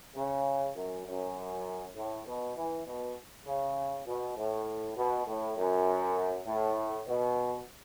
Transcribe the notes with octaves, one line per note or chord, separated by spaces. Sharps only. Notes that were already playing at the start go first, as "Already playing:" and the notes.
C#3
F#2
F#2
A2
B2
E3
B2
C#3
B2
A2
B2
A2
F#2
A2
B2